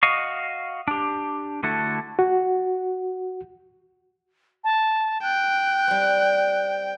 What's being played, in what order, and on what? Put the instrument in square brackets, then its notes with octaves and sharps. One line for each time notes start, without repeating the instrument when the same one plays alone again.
[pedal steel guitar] F#4 D#5 F5 C#6
D4 G4
D3 A3 E4 F#4 A4
[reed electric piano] F#4
[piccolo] A5
[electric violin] G5 [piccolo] F#6
[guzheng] G3 C4